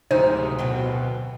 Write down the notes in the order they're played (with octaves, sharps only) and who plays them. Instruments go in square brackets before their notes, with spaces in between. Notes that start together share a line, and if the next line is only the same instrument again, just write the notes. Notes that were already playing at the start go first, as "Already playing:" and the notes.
[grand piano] D1 D2 [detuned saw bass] C3 [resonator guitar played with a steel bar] D#3 G#3 D#4 [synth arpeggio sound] C5
[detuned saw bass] B2 [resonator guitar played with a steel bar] F#3 B3 C4